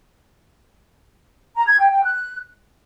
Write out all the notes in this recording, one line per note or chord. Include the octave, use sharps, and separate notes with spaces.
A#5
G#6
G5
G5
F#6